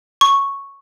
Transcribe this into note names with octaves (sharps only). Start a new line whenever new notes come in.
C#6